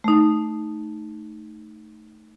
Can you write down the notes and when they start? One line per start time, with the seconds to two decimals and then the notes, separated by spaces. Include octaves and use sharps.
0.04 A3 D#4